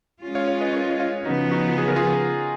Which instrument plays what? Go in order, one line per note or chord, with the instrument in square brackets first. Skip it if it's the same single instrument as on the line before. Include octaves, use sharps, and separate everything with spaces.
[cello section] G#3 C#4 F4
[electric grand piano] C#5 F5
C#5 F5
B4 D#5
A#4 C#5
C#5 F5
[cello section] C#3 F3 B3 [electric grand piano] D#4 F#4
[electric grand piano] D#4 F#4
G#4
A#4
F4 G#4